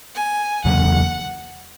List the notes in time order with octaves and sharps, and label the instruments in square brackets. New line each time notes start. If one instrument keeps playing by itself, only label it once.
[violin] G#5
[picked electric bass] E2 C#3 F#3 A#3 [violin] F#5